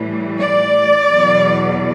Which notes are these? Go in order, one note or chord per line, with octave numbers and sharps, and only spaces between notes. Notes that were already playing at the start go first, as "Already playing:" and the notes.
Already playing: A2 E3 G3
D5
E2 B2 F#3